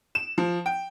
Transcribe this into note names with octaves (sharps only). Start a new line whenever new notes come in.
E7
F3
G5